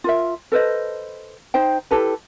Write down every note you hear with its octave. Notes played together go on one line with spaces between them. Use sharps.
F4 A#4 E5
A4 B4 C5 D#5
D#4 C5 G5
E4 G4 A4 B4